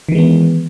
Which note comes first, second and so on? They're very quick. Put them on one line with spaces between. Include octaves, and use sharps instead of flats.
D#3 E3 G#3 B3